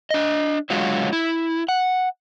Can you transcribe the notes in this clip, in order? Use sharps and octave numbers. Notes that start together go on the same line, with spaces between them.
D4 D#5
D3 F#3 G#3 F4 F#4 C#5
E4
F#5